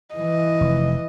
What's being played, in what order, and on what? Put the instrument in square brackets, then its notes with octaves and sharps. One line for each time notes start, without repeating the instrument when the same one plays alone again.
[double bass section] E3 [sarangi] D#5
[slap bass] F1